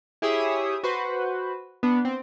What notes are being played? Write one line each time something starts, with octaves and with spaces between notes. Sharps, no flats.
E4 G4 G#4 C#5 E5 D#6
F#4 B4 C5
B3 D4
C4